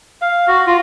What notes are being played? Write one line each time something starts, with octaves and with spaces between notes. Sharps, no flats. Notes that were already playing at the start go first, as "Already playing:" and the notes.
F5
F#4
F4